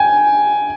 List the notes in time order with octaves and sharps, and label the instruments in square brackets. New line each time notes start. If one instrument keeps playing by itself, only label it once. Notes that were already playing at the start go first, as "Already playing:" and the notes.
Already playing: [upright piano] G5 G#5